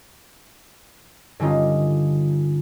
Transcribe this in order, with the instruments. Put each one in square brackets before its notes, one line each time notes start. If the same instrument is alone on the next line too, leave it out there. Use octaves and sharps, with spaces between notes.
[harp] G2 D3 C#4 D#4 F4